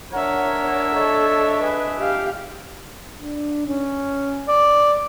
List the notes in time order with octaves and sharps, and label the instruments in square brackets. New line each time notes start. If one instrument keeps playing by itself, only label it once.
[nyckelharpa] D4 E5 [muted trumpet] A#4 [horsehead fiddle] C#5 [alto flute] F#5
[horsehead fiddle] A4 [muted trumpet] C#5 [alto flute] D#5
[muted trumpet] G#4 [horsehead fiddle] B4
[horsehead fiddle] G4 F5
[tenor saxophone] D4
C#4
D5